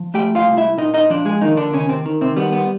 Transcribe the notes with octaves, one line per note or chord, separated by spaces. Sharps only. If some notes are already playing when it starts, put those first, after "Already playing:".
Already playing: F3
A3 G4 G5
F4 F5
C2
E4 E5
A#2 D#4 D#5
D#4 D#5
F3 D4 D5
G#3 G#4
D#3 A#3 D#4
D3 D4
D#2 C#3 C#4
C3 C4
D#3
C3 C4
G3 B3
B3